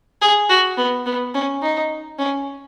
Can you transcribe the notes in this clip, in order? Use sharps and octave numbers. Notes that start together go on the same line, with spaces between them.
G#4
F#4
B3
B3
C#4
D#4
C#4